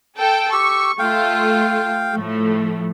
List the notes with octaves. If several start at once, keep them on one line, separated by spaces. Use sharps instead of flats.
A4 G5
G4 C#6 E6
A3 F4 F5 G5
A2 F3 A3